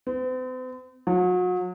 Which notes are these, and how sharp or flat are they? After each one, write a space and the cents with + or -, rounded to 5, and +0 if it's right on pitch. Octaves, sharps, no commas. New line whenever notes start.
C4 -45
F#3 -35